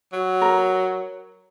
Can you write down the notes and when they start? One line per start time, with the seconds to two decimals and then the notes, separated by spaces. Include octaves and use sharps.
0.13 F#3
0.42 A#4